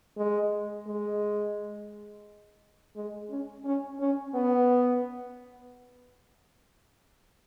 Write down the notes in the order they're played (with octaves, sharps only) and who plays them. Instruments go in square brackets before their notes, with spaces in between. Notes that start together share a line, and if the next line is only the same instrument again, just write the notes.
[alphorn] G#3
G#3
G#3
C#4
C#4
C#4
B3